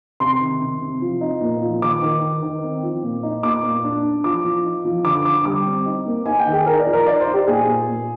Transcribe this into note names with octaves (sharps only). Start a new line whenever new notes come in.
C3 C6
D#3
C3
C3
F3
D#4
A#2
F3
D#3 D6
D#3
D#3
D#3
C4
F3
A#2
D#4
A#2 D6
A#2
D4
D4
F3 D6
F3
D#4
F3
D3 D6
D3 D6
G3 D6
C4
D#4
A#3
D#4 G#5
G5
D#3
G#4
D#4 A#4
D5
F3
A#4
D#4 D5
C5
D#4
G4
A#2 G#4
A#2
A#2